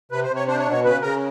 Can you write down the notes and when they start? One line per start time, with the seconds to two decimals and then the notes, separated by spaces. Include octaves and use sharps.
0.12 C3 B4
0.24 C5
0.29 C3
0.36 C#5
0.48 D4 C5
0.59 C#5
0.65 B2
0.72 C#5
0.84 C#3 B4
1.02 C#3 A#4